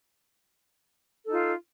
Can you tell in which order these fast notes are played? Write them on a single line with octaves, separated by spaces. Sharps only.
A4 D#4 F4